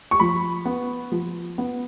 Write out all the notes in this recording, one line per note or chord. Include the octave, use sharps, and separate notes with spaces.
C#6
F3 B5
B3
F3
B3